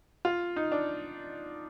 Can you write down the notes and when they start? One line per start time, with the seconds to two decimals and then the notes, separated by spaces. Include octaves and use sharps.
0.25 F4
0.56 D#4
0.72 D4